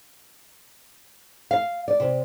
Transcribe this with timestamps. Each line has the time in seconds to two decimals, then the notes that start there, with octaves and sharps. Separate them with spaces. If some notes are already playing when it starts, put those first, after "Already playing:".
1.51 F5
1.88 D5
2.00 C3